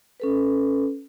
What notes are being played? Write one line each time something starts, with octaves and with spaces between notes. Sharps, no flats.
C#4 A4 B4